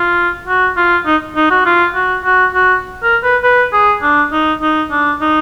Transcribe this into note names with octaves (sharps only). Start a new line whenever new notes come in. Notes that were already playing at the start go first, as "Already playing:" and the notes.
Already playing: F4
F#4
F4
D#4
D#4
F#4
F4
F#4
F#4
F#4
A#4
B4
B4
G#4
D4
D#4
D#4
D4
D#4